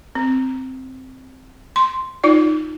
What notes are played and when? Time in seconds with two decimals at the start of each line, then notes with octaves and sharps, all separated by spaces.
0.15 C4
1.76 C6
2.24 D#4 F4 D5